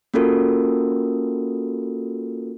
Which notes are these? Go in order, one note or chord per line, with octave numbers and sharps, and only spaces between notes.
A#3 C#4 F4 F#4 A4 A#4